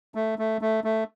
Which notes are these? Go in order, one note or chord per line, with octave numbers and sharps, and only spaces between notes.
A3
A3
A3
A3